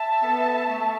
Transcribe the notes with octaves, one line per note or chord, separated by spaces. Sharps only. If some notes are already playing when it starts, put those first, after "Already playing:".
Already playing: E5 A5
B3 A4
A3